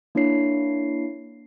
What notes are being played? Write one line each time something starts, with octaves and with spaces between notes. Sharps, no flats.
A#3 D4 E4 C#5 C7